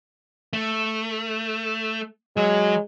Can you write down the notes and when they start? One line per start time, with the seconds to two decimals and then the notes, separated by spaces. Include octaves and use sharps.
0.53 A3
2.37 F#3 G#3